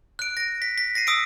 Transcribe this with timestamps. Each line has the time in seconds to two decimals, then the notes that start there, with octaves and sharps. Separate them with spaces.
0.19 F#6 D7
0.37 A#6 D7
0.62 B6
0.78 B6
0.95 A#6 C7 D#7
1.07 D#6 E6 B6 D7